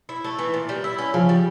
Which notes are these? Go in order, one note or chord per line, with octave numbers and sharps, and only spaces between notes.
E4
A3
E3
A#2
G3
E4
C#4
C#3 F3
G3